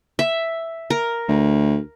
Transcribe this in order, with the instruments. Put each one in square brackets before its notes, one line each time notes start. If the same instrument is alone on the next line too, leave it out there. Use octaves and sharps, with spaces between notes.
[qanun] E5
A#4
[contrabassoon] D2